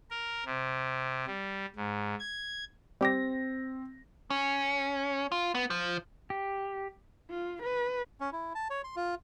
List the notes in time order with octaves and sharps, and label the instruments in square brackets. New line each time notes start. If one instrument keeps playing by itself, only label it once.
[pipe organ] A#4
C3
G3
G#2
G#6
[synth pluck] G3 G4 [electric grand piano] C4 A#6
[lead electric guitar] C#4
F4
B3
F3
[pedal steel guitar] G4
[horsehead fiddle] F4
B4
[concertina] C#4
E4
A5
C#5
C6
F4